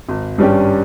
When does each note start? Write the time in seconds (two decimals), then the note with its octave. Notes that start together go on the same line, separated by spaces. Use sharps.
0.09 G#1
0.38 G2 G3 C#4 G4